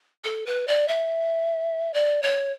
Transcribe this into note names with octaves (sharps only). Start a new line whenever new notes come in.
A4
B4
D5
E5
D5
C#5